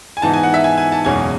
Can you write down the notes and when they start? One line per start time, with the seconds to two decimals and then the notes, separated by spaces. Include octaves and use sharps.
0.17 G#5
0.22 G#2 E3 B3 D#4 A5
0.34 G#5
0.43 F#5
0.54 E5
0.64 G#5
0.78 G#5
0.92 A5
1.05 F#1 E2 B2 G#3 C#4 G#5